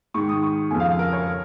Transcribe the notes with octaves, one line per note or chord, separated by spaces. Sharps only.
G#2 D#3 C#6
D#6
C#6
F2 C#3 F3 G#5
F5
A#4
C#5
A#4